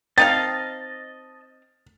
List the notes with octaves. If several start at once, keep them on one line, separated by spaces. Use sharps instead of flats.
C4 D#4 D#5 F5 A5 A6